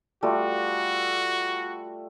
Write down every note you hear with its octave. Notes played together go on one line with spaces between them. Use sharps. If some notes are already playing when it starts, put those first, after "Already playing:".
G3 A3 F4 F#4